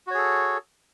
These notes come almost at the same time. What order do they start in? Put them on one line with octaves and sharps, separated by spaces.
F#4 C#5 G#4 A4